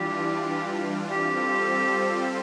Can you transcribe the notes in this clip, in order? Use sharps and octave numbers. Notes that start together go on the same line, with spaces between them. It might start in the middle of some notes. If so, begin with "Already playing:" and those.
Already playing: E3 G3 D4 F4 G4
G3 C4 F4 G4 A4 C5